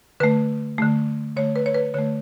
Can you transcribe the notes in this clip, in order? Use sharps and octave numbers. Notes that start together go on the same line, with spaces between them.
D3 A3 B4
D3 A3
D3 A3 C#5
B4
C#5
B4
D3 A3 C#5